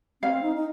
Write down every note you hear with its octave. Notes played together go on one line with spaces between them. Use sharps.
C4 F5
D#4
D#4